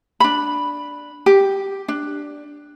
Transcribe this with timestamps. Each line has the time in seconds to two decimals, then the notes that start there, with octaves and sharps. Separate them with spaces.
0.20 D4 B5
1.26 G4
1.88 D4